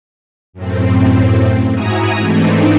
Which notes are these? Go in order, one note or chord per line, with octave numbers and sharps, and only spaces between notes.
F#2 A2 C4
G#2 E4 F#4 G#5 A#5 D#6
G#2 E3 A3 C4 D4 D#4